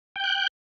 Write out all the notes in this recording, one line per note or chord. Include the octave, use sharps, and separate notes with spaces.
G5 F#6 G6